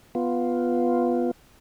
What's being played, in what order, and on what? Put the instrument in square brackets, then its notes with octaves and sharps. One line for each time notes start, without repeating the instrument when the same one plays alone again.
[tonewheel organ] B3 F4